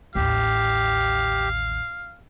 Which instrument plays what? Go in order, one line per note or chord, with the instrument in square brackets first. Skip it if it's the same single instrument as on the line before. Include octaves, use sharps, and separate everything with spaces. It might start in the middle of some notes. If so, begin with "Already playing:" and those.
[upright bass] A1 D#2 [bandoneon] G4 [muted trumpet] F5